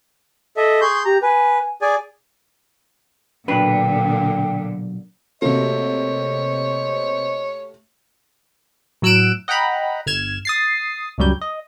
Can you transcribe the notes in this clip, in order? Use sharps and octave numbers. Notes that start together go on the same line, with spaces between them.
A4 D#5 E5
G#4 C6 C#6 G6
G4 A#5
B4 G#5
G#4 D5 G#5
B1 A#2 D3 D4 B4 G5
C3 A3 A#3 F#4 G4 C5 C#5 D#5
A2 F#3 E6 F#6 D7 E7
D#5 F#5 G5 A#5 B5
G1 F6 G#6 E7
D#6 A6 C7
C#2 F#2 F#3 G3 G6
D#5